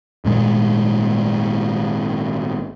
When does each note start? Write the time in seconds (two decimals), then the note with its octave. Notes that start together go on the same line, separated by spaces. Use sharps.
0.25 G#1 A#2 G#3